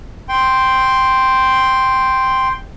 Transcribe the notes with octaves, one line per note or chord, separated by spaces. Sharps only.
G5 C6